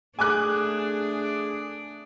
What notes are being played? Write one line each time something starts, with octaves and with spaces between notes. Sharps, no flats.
A3 D4 G#4 G#5 D6 F#6